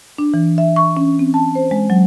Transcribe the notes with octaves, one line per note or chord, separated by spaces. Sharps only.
D4
E3
E5
C#6
C#4
C4
A5
C5
G#3
F#3